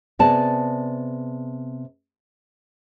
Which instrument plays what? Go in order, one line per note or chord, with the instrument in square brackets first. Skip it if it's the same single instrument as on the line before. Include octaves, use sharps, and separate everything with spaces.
[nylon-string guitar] C3 B3 G#4 D5 A5